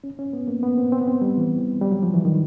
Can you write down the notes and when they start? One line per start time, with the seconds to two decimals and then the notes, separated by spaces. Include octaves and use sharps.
0.04 C#4
0.19 C#4
0.33 B3
0.48 A#3
0.63 B3
0.78 C4
0.92 C4
1.01 B3
1.08 C4
1.22 G3
1.37 E3
1.81 G3
1.91 F#3
2.03 F3
2.14 E3
2.25 D#3